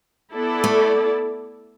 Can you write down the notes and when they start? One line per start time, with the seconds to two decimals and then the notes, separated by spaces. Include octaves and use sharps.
0.33 B3 E4 A4 D5
0.64 A3